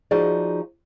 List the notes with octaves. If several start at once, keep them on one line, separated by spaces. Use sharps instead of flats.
F3 D#4 F#4 G#4 D5